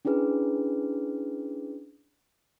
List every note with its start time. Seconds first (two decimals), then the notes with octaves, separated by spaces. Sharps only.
0.05 C#4 D4 E4 G#4 B4